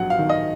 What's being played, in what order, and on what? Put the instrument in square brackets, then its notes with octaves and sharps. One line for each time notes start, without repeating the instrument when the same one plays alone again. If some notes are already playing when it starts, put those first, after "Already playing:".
Already playing: [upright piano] A#1 F#3 F#5
F5
D#3
D#5